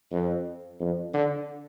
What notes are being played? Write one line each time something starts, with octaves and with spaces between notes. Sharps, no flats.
F2
F2
D3